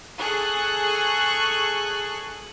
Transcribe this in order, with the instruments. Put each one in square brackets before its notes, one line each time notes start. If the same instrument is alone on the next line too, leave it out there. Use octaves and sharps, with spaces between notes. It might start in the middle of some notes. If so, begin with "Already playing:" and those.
[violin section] G#4 A4 C#6 F#6